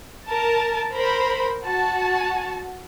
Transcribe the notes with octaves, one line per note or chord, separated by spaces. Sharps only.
A#4 A5
A#4 C5 B5
F#4 A5